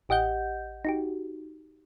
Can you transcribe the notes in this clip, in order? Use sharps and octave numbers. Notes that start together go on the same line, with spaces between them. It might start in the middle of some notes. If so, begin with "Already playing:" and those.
A1 G4 D#5 F#5 G6
D#4 F#4 G4